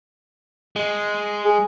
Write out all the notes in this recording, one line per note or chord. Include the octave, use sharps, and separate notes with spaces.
G#3
G#4